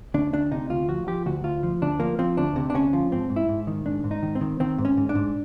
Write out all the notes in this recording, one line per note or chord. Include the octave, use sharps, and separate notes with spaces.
D2 D4
D2 D4
C3 D#4
D2 F4
F3 F#4
F3 G4
D2 F#4
D2 F4
F3
D2 D4
F3 A#3
F3 C4
D2 D4
C3
D4
D2 C#4
F3
G#2 C4
G#2
E4
G#2
D#3
G#2 D4
G#2
D#4
D#3
C4
D#3
D#3 C4
G#2
C#4
G#2
D4
G#2